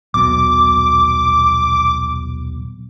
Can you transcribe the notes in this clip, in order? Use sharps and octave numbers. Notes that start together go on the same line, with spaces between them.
D#1 B1 B2 D6